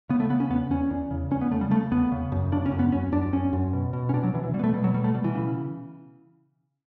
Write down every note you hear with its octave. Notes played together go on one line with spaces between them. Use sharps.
C#3 B3
A3
C#3 B3
C#4
E2 B3
E2 C#4
E2
C#3
E2 C#4
B3
C#3 A3
G3
C#3 A3
E2 B3
C#3
F#2
C#3 D4
C#4
F#2
B3
F#2 C#4
F#2 D4
F#2 C#4
F#2
B2
B2
C#4
B2 D4
F#3
B2 E3
E3
B2 G3
B3
A3
B2 G3
F#3
B2 G3
A3
B2 G3
E3
C#3